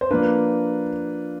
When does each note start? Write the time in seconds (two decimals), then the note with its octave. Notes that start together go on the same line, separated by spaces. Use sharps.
0.01 C5
0.11 F3 A#3 D4 B4